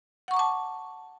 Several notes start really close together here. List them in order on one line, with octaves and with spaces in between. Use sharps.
F#5 C#6 A#5 D6 A5